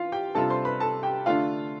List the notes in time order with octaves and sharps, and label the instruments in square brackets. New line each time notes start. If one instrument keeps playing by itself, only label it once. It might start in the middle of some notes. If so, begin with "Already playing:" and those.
Already playing: [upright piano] E3 F4 F5
G4 G5
C3 G3 D4 F4 A4 A5
C5 C6
B4 B5
A4 A5
G4 G5
D3 A3 D4 F4 F5